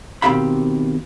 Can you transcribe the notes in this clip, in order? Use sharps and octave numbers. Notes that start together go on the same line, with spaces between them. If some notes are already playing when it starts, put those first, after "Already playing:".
B2 D#3 C4 G4 F5 B5